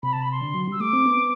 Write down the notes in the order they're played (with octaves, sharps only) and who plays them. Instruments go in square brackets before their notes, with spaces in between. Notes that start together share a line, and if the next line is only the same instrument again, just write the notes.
[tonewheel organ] C3 [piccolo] B5
[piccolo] A5
B5
C6
[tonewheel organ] D3
F#3
[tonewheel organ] G3 [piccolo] E6
[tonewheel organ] A3 [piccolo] D6
[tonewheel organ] C4
B3